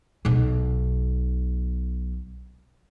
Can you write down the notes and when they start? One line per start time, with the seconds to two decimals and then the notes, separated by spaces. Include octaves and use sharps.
0.25 B1 B2